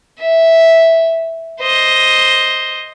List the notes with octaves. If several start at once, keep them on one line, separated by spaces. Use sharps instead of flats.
E5
C5 D#5